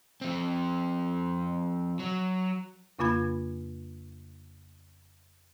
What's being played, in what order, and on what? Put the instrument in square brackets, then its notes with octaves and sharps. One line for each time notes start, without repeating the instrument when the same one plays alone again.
[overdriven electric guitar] F3 C4
F#3
[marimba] F2 C#3 A#3 F4 B5 G#6